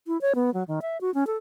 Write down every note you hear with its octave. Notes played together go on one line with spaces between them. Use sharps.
E4
C#5
B3
F#3
D#3
E5
F#4
C#4
A4